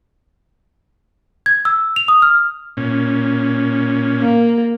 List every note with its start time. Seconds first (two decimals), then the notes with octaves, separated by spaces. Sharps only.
1.46 G#6
1.65 E6
1.96 F7
2.08 D#6
2.22 F6
2.77 A#2 C#4
4.22 A#3